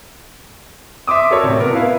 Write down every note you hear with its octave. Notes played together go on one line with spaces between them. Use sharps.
E5 C6 D6 D#6
F#4 A4 A#4 C#5 D5
A2 C3
B3 A#4
E4 B4 F5